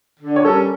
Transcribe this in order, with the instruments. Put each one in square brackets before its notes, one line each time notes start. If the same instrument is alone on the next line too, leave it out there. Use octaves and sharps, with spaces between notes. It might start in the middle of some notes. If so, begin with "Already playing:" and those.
[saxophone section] D3
[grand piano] C#5
[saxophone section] G3 C#4 [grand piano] A4
[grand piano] A#4